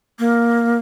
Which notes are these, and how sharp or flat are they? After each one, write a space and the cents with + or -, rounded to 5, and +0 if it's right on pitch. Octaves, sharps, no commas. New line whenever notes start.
A#3 +5